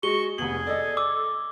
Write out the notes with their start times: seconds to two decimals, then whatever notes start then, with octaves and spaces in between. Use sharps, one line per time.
0.03 G#3 F#4 C#6 G7
0.38 F1 B3 G#4 F#7
0.67 A4 D5 D#5
0.97 D6 E6